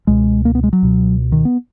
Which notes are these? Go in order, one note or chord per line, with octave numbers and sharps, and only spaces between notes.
C#2 B2 G#3
A#3
B3
G#3
F#3
C#2 B2
D#3
B3